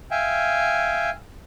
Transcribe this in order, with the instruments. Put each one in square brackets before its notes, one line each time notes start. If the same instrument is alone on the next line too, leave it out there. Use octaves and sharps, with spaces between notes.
[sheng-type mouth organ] E5 F5 G5 G#5